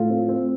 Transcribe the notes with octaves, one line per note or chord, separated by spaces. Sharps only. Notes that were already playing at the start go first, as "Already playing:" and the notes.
Already playing: A2 F4 A4
C4
C4